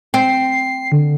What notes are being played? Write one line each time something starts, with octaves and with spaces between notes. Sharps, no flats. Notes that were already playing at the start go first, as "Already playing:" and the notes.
C4 C7
D3